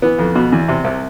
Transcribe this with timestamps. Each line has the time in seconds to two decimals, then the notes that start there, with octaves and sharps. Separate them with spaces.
0.02 E3 B3
0.19 F2
0.35 B2
0.52 E2
0.68 C3
0.84 C2